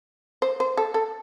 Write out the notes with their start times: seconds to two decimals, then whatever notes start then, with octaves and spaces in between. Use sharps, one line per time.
0.42 C5
0.60 C5
0.77 A4
0.94 A4